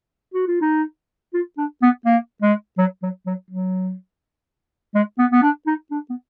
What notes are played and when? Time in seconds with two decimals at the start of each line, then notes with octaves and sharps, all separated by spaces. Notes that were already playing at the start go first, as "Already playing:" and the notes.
0.34 F#4
0.47 F4
0.61 D#4
1.34 F4
1.58 D4
1.82 B3
2.06 A#3
2.42 G#3
2.78 F#3
3.02 F#3
3.27 F#3
3.50 F#3
4.95 G#3
5.18 B3
5.32 B3
5.42 D4
5.67 D#4
5.91 D4
6.10 B3